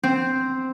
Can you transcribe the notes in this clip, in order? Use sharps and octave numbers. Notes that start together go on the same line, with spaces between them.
C4